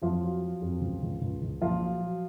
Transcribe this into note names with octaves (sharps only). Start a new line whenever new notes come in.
F2 F3 F4
F#3
F#3
F2
C#2
C#2
C#2
C#2
A#2 F3 F4
F#3
F#3